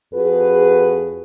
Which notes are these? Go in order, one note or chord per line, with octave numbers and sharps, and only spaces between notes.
F2 F#4 G#4 B4